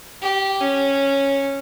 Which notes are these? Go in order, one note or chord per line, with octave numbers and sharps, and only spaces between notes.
G4
C#4